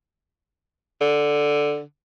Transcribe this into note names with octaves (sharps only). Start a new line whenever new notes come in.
D3